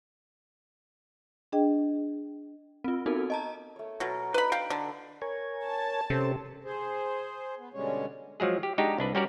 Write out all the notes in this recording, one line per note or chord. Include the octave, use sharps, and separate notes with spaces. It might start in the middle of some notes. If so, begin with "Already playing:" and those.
D4 G#4 D#5 G5
C4 F4
B3 C4 D#4 F#4 A4 A#4
D#5 A5 A#5
A3 C#5
B2 F#3 F#4 A#4 C#5
D4 D#4 B4 C5 B5
F5 G5 A#5
D3 A4
A#4 C#5 G#5
A5
C3 C#4 A4 C5
G#4 C5
B3
B2 D3 G3 G#3 C#4 C#5
F3 F#3 G#3 G#4
G4
G#3 D4 D#4 F#4 G4
C2 D4 B4
G3 C#4 F#4 A#4 C#5 D5